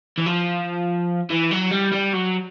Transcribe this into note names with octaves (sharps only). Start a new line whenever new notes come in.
E3
F3
E3
F#3
G3
G3
F#3